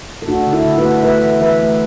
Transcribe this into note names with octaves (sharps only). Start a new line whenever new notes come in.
A4
A3 D4 F#4
D3
E4 A4
D3
F#4 B4
A3
A3 B4 E5
E3
E3 B4 E5
A3